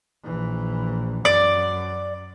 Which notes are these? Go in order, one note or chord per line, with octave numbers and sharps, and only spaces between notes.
A#1 E3
F#2 D5